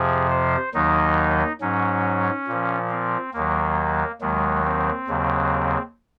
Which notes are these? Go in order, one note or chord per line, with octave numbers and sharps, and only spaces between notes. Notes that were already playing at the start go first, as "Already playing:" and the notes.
Already playing: F2 C3 F3 G#4
C5
D#2 D#3 F#3 D#4
G#2 F#3 C#4
A#2
F3
C4
D#2 D#3 F#3 A#3
D#2 D#3 F#3 G#3
C4
D#2 C#3 F#3